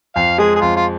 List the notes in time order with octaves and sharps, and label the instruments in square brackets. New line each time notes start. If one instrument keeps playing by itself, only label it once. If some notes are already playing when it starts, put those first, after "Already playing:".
[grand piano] F2 [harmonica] F5
[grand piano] G#3 [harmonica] G#4
[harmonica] G#4
[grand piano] F2 [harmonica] F4
[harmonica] F4